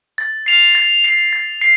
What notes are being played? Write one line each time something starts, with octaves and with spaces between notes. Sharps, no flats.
A6
C7 F7
A6
C7 F7
A6
C7